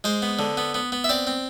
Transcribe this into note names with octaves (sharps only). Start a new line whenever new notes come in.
G#3 C5
B3
D3
B3
B3
B3
E5
C4 D5
C4